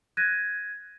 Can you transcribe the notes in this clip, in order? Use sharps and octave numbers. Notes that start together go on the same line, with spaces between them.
F#6 G#6 A#6 D#7